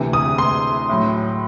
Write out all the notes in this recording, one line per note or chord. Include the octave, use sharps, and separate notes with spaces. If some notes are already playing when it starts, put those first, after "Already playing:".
Already playing: D2 C3 E3
D#6
C6
A2 F#3